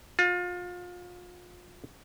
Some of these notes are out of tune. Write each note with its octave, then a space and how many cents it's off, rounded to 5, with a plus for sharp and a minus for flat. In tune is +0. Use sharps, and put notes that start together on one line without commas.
F4 +30